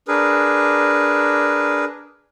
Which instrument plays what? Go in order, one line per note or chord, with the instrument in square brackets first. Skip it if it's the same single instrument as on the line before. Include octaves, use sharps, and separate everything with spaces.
[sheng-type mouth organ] D4 G#4 A#4 B4